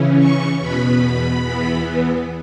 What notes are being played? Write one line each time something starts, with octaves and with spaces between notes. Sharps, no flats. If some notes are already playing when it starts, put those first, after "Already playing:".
Already playing: C#3 E3 C#4
C#6
E2 B2 B3 B5
E2 E3 B3